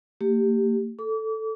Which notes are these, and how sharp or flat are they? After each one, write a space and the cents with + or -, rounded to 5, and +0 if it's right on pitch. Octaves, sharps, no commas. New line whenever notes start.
A#3 -45 G4 +0
A4 +0 D6 -35